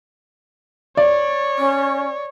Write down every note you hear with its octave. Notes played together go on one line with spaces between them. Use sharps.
C#5 D5
C#4